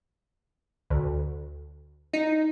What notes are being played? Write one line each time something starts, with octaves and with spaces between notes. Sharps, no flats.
D2
D#4